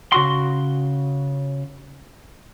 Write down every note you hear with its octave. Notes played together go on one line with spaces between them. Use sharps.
C#3 F#4 C6